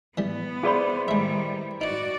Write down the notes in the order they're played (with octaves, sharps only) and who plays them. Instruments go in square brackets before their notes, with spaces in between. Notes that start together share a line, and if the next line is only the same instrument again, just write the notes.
[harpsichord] E3 G3 [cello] B3
[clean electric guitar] E4 B4 C5 [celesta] G#4 D5 B5
[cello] D#3 G3 [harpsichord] G#3 E5
[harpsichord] D#4 D#5 [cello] F#4 D5